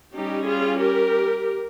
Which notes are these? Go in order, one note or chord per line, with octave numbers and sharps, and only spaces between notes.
G3 C#4 D#4 G4
F4 G#4
G4 A#4